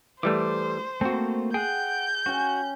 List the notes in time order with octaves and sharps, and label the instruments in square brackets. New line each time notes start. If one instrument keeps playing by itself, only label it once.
[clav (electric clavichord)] E3 G3 A3 [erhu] C5 [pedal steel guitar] D6
[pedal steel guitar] A3 A#3 [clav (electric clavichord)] C4 F#4
[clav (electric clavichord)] G#4 [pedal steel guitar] F#5 G5 [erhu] G6
[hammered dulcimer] C#4 G5 [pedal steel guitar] F#4